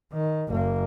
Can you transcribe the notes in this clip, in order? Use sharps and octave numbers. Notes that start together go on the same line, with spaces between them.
D#3
F#1 A#3